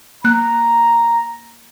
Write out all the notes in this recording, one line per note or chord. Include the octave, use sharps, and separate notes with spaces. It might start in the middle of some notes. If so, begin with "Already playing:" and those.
A#3 A#5 F#6